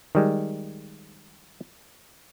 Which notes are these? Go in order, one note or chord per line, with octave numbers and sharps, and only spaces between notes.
D#3 G3 G#3